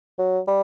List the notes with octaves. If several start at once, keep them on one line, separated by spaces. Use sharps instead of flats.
F#3
G3